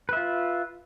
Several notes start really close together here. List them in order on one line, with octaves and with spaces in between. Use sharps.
B4 E5 F4